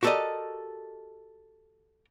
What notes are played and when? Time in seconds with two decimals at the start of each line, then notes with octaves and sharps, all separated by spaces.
0.03 F#4 G4 A4 A#4 D5 D#5